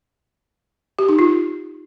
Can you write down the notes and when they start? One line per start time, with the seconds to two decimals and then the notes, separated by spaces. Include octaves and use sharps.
0.99 G4
1.09 D#4
1.19 F4